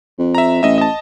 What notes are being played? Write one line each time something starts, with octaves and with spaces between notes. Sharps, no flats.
F2
E5 A#5
A1 D#5 E5
D#5 A5